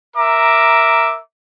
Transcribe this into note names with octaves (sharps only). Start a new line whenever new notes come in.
A#4 E5 A#5 D6